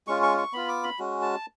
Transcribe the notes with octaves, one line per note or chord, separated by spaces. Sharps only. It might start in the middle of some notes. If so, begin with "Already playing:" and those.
G#3 C#4 F4 C#6
C#6
C#6
B3 F4 B5
D6
B5
G#3 C#4 F#4
A5